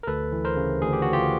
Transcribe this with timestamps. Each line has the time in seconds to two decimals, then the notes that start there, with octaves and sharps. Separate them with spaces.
0.03 A#4
0.07 D2 A4 B4
0.32 E3
0.45 A#4 C5
0.56 C#3
0.82 D2 G#4
0.93 G4
1.02 D2 F#4
1.13 F4 G4